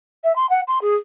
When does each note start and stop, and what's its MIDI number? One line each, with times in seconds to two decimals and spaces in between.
0.24 0.35 76
0.36 0.46 84
0.50 0.61 78
0.68 0.79 84
0.82 0.95 68